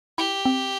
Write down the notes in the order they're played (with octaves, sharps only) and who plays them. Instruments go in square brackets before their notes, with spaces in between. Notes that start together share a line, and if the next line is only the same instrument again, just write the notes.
[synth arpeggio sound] E4 [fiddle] G4
[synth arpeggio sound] C4